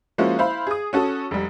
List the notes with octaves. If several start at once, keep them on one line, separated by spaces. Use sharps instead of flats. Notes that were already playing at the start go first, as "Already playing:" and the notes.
F3 G#3 A#3 C#4 E4 F#4
E4 C5 F5 B5
G#4 D#6
C#4 F#4 A4
F1 G3